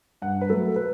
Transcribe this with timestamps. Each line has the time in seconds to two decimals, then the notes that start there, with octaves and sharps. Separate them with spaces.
0.22 G2 F#5
0.41 B4
0.49 F#3 A3 A4
0.76 B4